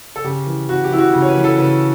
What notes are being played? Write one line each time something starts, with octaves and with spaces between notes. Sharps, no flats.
A4
C#3 G4
E3
C#3 F#4
G4
E3 E4
F#4
C#3
C#5
B4
E3
A4
C#3 B4